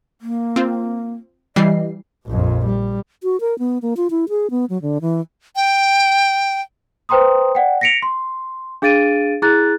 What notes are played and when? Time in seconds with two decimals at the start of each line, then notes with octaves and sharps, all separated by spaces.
0.21 A#3
0.56 C4 F4
1.56 E3 G3 D#5 C7
2.26 A#1 F2
2.65 G3
3.23 F#4
3.40 A#4
3.59 B3
3.82 A#3
3.97 F4
4.10 E4
4.29 G#4
4.50 B3
4.70 F#3
4.82 D3
5.01 E3
5.56 G5
7.09 B4 C5 G5 A#5 C6 D#6
7.55 D5 F#5 G5
7.81 A#6 B6 C#7 D7 F7
8.02 C6
8.82 D4 G#4 F5 A6 D7 D#7
9.42 E4 G#4 A#5 F#6 A6